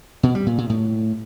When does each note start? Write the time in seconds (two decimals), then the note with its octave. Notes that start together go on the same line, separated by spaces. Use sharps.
0.23 B2
0.35 G3
0.46 A#2
0.58 A#2
0.70 A2